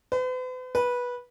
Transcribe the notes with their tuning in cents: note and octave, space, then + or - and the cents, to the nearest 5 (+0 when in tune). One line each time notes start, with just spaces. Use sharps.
B4 +45
B4 -15